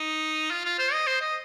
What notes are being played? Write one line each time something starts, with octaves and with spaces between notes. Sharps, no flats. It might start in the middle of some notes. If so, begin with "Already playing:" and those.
Already playing: D#4
F4
F4
C5
D#5
C5
D#5